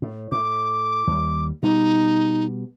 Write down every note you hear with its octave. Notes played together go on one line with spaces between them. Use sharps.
A2
A2 D6
D#2 G3
B2 G3 D#4